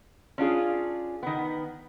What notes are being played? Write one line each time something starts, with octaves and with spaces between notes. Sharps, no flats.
C#4 D4 F4 G#4
D#3 B3